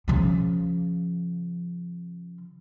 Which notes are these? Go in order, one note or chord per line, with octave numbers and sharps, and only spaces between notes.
C#3 F3